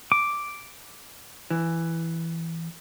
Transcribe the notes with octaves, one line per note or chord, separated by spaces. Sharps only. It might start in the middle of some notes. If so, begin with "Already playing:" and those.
D6
E3